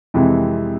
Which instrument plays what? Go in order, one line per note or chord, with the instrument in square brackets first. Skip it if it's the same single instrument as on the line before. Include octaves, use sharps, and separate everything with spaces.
[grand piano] F2 C3 E3 G#3